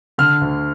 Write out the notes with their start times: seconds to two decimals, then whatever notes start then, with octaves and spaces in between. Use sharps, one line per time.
0.18 D3 F6
0.41 D2